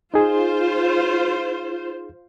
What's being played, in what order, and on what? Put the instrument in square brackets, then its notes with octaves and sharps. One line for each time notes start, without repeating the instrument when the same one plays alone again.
[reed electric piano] D#4 G#4 [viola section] F4 C5